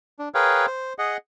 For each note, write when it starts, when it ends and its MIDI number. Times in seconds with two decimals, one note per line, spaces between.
0.19 0.29 62
0.35 0.66 68
0.35 0.66 70
0.35 0.66 71
0.35 0.66 73
0.35 0.66 77
0.35 0.66 79
0.66 0.93 72
0.98 1.17 68
0.98 1.17 75
0.98 1.17 78